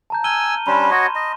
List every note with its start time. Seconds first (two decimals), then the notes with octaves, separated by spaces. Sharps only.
0.10 A5 A#5 G6
0.24 G#5 E6 F6 D#7 G7
0.67 G3 C#4 D4 B5 C6 E7
0.91 F#4 C#5 D#5
1.15 D#5